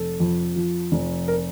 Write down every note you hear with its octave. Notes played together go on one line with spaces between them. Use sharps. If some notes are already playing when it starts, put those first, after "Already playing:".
Already playing: F1 A4
F2
F3
F1
A#4